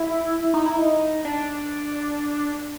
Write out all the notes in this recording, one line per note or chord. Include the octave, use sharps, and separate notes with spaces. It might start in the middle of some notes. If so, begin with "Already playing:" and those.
Already playing: E4
D#4
E4
D#4
D4